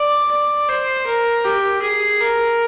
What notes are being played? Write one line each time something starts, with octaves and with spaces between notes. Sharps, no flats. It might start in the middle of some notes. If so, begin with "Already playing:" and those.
Already playing: D5
D5
C5
A#4
G4
G#4
A#4